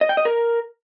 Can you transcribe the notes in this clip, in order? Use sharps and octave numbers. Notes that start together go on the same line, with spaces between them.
D#5
G5
D#5
A#4